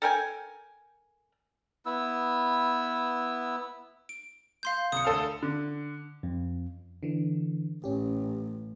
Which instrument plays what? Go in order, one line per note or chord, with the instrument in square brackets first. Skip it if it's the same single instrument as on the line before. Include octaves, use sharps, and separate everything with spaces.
[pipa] A4 A#4 G5 G#5
[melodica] B3 E4 E6
[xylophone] D7
F5 C6 G6
[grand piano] C2 [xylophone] D#6 C#7
[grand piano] D2 A4 F5
D3
[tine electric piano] F2
[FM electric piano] D3 E3
[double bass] A1 [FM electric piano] C#4 G4